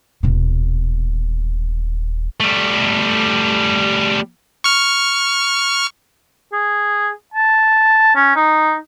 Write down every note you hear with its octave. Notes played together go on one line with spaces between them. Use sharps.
D#1 B2
G3 A3
C#6 F6
G#4
A5
C#4
D#4